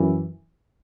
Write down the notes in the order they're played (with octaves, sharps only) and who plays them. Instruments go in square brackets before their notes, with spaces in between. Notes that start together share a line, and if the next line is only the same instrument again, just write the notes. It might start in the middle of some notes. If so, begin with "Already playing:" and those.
Already playing: [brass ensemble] F#2 E3